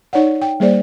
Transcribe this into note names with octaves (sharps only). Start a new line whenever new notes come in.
D#4 C#5 D5 F#5
G5
G3 A#3 G#4 C5 D5